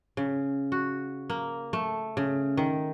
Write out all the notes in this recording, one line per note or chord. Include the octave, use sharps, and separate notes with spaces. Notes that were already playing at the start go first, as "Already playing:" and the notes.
C#3
F#4
A#3
A3
C#3
D#3